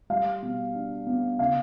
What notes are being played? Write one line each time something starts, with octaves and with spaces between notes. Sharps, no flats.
G3 F5
B2
D4
B3
C#3 F5